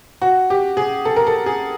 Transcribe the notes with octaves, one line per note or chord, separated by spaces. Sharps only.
F#4
G4
G#4
A4
A#4
A4
G#4